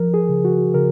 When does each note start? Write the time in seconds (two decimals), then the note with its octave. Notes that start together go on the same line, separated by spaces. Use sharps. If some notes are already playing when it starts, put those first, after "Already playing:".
Already playing: F3 A#4
0.14 G#4
0.29 C#3
0.45 F#4
0.74 C#3 A#4